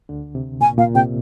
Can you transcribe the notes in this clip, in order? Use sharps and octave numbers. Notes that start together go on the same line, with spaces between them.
D2 D3
C3
A#2 G#5
A#2 F5
C3 G5